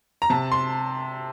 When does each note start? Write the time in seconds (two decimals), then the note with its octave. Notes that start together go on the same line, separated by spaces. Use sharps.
0.22 A#5
0.30 C3 A5
0.52 C6